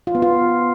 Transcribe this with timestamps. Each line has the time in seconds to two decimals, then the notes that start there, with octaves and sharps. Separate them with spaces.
0.07 F4
0.15 B3
0.22 F4